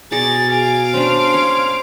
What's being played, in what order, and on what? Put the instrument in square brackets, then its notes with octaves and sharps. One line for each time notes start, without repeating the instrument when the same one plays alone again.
[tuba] B2 [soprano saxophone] G#4 [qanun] D5 A#5 C#6 [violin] A6
[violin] F5 D7 [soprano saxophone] G#5
[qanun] C#4 D4 [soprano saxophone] C5
[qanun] C#5